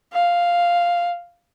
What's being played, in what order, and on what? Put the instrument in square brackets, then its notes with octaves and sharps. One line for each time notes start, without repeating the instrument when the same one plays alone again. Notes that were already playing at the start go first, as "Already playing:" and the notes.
[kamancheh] F5